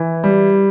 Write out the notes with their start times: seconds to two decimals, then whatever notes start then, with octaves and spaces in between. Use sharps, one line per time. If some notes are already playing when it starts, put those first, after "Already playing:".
Already playing: E3
0.24 G3